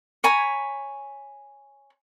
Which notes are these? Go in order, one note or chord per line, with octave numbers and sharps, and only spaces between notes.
C#5 G#5 A#5 B5